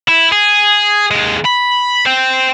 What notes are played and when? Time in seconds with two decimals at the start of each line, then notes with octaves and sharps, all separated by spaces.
0.08 E4
0.32 G#4
1.11 D#2 G#3
1.45 B5
2.06 C5 G5